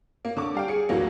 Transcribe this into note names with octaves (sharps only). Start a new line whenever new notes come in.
A#3
D3 C#6 D6
G3 F5 G5
G#4 C#7
D2 A2 E3 F#3 A#3